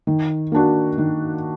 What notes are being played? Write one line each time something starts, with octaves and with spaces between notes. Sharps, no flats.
D#3
A#3 D4 F#4
D#3